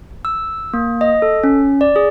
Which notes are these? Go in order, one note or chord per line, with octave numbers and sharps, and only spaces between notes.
E6
A#3
D#5
A4
C#4
D5
G#4